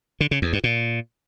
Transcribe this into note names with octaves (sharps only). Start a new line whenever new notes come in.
D3
C#3
E2
G2
A#2